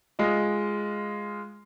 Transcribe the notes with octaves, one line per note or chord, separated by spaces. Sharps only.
G#3 F4 D#5